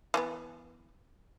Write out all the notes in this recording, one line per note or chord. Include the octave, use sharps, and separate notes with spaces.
E3 A3 B3